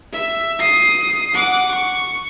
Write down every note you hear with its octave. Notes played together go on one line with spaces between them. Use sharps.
E5
D#6 C7
F#5 D6
C#6